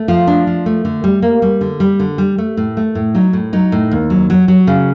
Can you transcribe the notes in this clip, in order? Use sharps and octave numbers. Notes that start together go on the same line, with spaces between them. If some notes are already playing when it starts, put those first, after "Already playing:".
Already playing: A3
F3 F4
D4
F3
A3
D3
G3
A#3
G3
D3
G3
D3
G3
A3
A2
A3
A2
F#3 D#4
A2
F#3 D#4
A2
D#2
F#3
F#3
F#3
C#3